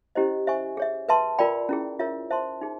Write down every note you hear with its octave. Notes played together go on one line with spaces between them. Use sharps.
C#4 E4 G4 C5 D#5
C5 E5 G#5 C#6
G#4 C#5 E5
B4 E5 A5 C6
F4 A#4 D5 G5 B5
C#4 E4 G#4
F4 A#4 C#5 E5
C5 E5 A5 C6
D#4 G#4